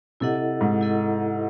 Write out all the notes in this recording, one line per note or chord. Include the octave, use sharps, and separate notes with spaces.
C3 E4 A4 D#5 F#5
G#2
E4 A4 D#5 F#5